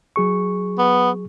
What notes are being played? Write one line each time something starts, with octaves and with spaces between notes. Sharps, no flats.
F#3 G#4 C#6
B3